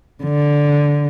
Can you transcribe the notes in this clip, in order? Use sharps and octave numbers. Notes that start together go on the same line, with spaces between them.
D3